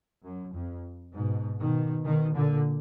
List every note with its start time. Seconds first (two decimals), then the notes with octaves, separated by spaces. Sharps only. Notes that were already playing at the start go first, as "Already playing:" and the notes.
0.24 F#2
0.54 F2
1.14 G#2 B2
1.59 B2 D#3
2.04 B2 D#3
2.34 A#2 D3